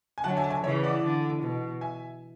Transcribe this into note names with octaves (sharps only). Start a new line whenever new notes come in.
G#5
D3 F#3 F#5 A5
E5 G#5
A5
E5 G#5
C#3 E3 C#5 E5
D5 F#5
D3
B2
E5 G#5